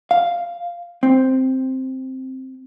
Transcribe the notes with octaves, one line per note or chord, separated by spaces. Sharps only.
F5
C4